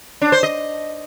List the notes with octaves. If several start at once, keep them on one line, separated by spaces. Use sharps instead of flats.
D4
C5
D#5